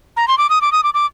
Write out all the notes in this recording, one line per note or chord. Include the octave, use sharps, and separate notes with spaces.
A#5
C6
D6
D#6
D6
D#6
D6
D6